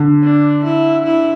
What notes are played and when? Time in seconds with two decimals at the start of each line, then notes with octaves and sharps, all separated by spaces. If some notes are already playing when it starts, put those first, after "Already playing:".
Already playing: D3
0.22 D4
0.64 E4
1.05 E4